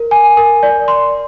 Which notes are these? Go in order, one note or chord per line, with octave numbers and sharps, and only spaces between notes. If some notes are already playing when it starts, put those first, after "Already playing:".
Already playing: A#4
G#5
A#4
D5
C6